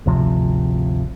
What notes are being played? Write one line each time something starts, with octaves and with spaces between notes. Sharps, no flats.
G#1 D2 C3 F3